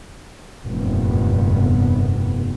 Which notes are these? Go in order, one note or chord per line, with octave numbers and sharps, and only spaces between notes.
F1 E2 G2 A#2 B3